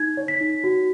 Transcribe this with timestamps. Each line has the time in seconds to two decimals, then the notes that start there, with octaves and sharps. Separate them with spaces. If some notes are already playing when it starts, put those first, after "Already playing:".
Already playing: D#4 G#6
0.17 C#5
0.28 B6
0.40 D#4
0.64 F#4